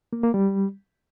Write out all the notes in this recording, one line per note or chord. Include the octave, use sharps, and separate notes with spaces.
A#3
A#3
G3